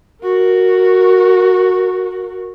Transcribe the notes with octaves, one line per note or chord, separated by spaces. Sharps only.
F#4 A#4